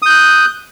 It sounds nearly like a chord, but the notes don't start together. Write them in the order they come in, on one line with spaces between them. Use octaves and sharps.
D#6 G6 F#6